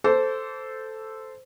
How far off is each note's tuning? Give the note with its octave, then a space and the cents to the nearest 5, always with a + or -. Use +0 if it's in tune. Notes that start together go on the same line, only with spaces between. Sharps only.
A4 +0 C5 -10 D6 -35